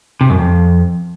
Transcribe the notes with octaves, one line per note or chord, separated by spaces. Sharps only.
C3
F#2
F2